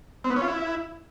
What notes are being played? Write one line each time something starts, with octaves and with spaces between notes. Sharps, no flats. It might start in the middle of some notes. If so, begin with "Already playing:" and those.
C4
B3
C#4
F4
E4